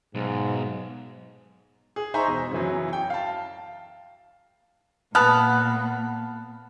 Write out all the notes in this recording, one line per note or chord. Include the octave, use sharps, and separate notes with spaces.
B1 G#2
G#4
D#4 C5 E5 G#5 A#5 C#6
E1
F#2 C#3 E3 F#3
G5
F5 A5
A#2 B3 A5 F6 F#6